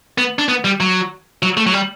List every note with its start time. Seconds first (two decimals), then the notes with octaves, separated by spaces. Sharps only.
0.18 B3
0.39 D4
0.49 B3
0.65 G3
0.80 F#3
1.43 F#3
1.57 A3
1.67 F#3
1.73 G3